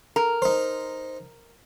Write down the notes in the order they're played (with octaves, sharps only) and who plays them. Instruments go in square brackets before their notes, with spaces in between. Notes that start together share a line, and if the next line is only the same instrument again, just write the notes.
[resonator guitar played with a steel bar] A#4
[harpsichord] D#4 C5